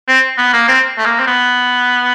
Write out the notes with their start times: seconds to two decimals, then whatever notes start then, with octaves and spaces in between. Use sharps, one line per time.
0.08 C4
0.38 B3
0.53 A#3
0.68 C4
0.98 A3
1.05 A#3
1.19 C4
1.27 B3